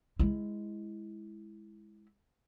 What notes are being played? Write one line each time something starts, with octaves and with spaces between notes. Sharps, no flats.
G#3 E4